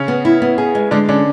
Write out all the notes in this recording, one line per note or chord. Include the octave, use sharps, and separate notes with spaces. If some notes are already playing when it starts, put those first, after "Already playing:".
Already playing: C#3 C#4
B3
E4
B3
G#4
G#3
D3 G#3 D4
D3 C#4 D4